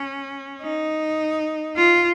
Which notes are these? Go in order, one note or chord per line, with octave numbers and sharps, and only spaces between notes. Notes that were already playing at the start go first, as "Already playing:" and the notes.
Already playing: C#4
D#4
F4